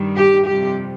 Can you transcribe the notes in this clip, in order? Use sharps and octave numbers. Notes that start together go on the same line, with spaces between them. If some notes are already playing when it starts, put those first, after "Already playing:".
Already playing: G2 D#3 G3
G4
F2 C3 G3 G4